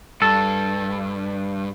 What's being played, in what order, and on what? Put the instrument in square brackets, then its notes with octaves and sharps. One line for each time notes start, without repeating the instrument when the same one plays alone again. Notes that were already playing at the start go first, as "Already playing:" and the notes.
[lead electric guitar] G2 [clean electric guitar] A4